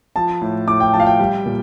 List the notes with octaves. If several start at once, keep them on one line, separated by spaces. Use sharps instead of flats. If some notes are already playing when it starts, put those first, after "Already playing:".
F3 A5
A2
A2 D6
G5
F3 A5
F5
G5
G3
A#2